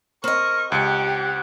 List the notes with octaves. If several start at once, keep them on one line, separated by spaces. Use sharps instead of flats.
C4 A#4 D#5 C#6
C#2 G4 F#5 C#7